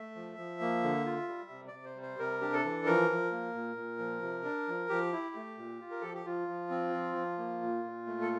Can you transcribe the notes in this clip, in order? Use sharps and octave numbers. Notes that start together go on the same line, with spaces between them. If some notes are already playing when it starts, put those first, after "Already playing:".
Already playing: A3 E5
F3
F3
A#3
D3
F4
G3
C3
D5
C3
C5
G3
C5
C3 A#4
D4 G4
A4
E3
F3 A#4
F3
A#3
A#2
A#2
F3
C3
D4
F3
F3 G4
E4
A3
A#2
F4
A#4
F3 A4
G4
F3 F4
F3
C4
F3
F3
A#3
A#2
A#2
A3
A4